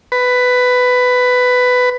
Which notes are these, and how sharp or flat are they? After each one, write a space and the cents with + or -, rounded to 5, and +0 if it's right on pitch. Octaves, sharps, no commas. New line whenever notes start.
B4 +10